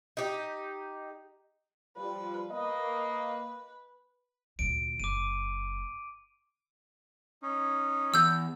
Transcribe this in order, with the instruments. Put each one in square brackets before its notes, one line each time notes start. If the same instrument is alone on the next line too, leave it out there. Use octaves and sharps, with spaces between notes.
[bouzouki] D#4 G4
[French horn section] F3 G3 [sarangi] B4
[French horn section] A#3 D#5 [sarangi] B4
[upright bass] D2 A#2 [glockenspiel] D7
[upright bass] F#1 [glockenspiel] D6 D#7
[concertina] C#4 D#4
[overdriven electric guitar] E2 [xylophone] E6 G6